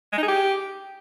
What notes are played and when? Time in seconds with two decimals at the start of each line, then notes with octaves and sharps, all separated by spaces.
0.13 G#3
0.18 D#4
0.23 G#4
0.28 G4